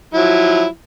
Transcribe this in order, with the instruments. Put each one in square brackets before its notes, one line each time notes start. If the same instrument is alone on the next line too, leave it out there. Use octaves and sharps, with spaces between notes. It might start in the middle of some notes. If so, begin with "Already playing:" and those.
[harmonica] F3 F#3 E4